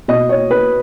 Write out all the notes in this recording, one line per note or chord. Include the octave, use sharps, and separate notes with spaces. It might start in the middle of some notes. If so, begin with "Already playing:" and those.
B2 D#5
C#5
B4